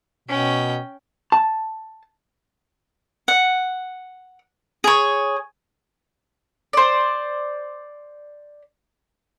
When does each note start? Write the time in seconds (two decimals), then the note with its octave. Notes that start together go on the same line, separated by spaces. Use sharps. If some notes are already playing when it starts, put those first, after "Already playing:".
0.28 B2 C#4 G5
1.32 A5
3.28 F#5
4.84 G#4 C#5
6.73 C5 D5